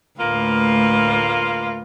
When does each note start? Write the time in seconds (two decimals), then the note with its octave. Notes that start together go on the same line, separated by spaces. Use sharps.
0.19 D2 A2 A#3 F4 B4